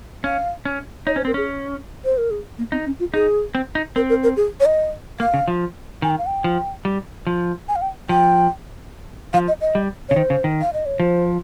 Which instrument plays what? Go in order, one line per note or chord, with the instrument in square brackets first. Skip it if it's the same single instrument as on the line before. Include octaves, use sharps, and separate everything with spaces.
[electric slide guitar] C#4 [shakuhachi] F5
[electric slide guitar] C#4
[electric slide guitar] D#4 [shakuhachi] C#5
[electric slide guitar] C#4 [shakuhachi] C5
[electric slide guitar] C4 [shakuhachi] A#4
[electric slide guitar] C#4 [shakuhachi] G#4
[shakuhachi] C5
A#4
G#4
A#3
[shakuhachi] C4 [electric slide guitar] D#4
[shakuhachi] C#4
F4
[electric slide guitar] D#4 [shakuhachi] G#4
[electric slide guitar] C4
D#4
[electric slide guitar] C4 [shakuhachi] A#4
[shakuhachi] A#4
A#4
G#4
C#5
D#5
[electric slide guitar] A#3 [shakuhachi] F5
[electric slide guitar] C#3
F3
[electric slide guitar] D#3 [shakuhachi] G#5
[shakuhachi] G5
F5
G5
[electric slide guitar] F3
G3
F3
[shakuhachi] G#5
F5
G5
[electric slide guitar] F3 [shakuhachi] G5
[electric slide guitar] F3 [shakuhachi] F5
[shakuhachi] D#5
D#5
[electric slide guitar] G3
[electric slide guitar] C#3 [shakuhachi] C#5
[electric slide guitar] D#3 [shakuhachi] C5
[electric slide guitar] C#3
D#3
[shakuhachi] F5
D#5
C#5
[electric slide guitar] F3 [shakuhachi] C5